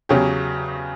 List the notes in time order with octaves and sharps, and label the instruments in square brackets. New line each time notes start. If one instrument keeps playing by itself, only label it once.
[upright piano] E2 C#3 F#3 C#4 G4